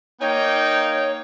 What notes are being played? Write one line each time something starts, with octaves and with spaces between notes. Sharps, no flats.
A#3 D#4 C#5 G5